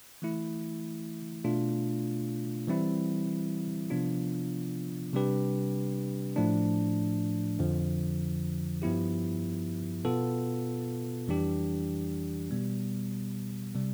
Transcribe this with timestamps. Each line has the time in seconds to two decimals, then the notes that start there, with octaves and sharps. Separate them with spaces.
0.22 E3 A3 E4
1.45 B2 A3 D4 F4
2.68 E3 G3 C4 E4
3.90 C3 F3 B3 D4 F4
5.14 C3 G3 D4 G4 B4
6.36 A2 F3 A3 D4
7.59 F2 D3 F3
8.82 G2 F3 B3 E4 G4
10.05 B2 B3 F4 A4
11.28 F2 E3 G3 D4 G4
12.51 B2 G3 B3
13.75 C3 G3